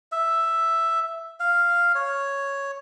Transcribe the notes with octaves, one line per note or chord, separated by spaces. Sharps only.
E5
F5
C#5